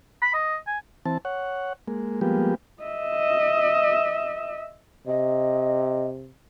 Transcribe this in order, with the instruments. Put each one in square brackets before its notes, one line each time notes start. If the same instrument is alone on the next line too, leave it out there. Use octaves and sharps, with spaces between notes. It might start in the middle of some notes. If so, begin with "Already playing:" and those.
[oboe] B5
D#5
G#5
[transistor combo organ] E3 C4 A5
C#5 F#5
G#3 A#3
F3 G3 G#3 A#3 B3 G4
[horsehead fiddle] D#5 E5
[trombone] C3 [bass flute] D#5